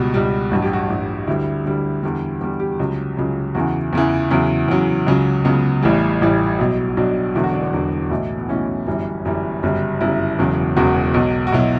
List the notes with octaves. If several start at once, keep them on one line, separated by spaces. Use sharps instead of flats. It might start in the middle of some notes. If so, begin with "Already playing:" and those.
Already playing: C#2 B2 G3 F#4
C#2 B2 G3
A1 G2 F#3 F#4
G4
F#4
A1 G2 F#3
D2 D3 G3 E4
D2 D3 G3
E2 D3 G3
E2 D3 G3 G4
G4
C#2 C#3 F#3
C#2 C#3 F#3
E2 C#3 E3 F#4
E2 C#3 E3
E2 C#3 F#3 E4
E2 C#3 F#3
C#2 C#3 F#3
C#2 C#3 F#3 B3
A1 A2 E3 G3
A1 A2 E3 G3
B1 B2 F#3
B1 B2 F#3 D4
E1 E2 D3 F#3 E4
F#4
D4
B3
E1 E2 D3 F#3
B1 A2 E3
B3
B1 A2 E3 C#4
G1 F#2 E3 G3
G1 F#2 E3 G3
G1 F#2 C#3 G3
G1 F#2 C#3 G3 E4
E1 E2 C#3 F#3
E1 E2 C#3 F#3 F#4
B1 B2 F#3
F#4
B1 B2 F#3 E4